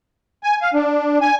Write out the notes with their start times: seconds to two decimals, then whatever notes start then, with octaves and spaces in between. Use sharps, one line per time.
0.43 G#5
0.62 F5
0.74 D4
1.21 G#5